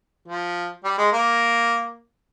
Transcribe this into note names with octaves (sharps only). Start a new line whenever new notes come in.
F3
G3
G#3
A#3